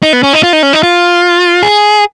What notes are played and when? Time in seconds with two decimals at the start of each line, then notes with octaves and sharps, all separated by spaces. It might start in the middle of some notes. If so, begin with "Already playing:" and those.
0.03 D#4
0.13 B3
0.23 C#4
0.33 D#4
0.43 F4
0.53 D#4
0.63 C#4
0.73 D#4
0.83 F4
1.63 G#4